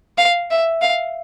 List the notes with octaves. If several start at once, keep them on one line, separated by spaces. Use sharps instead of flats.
F5
E5
F5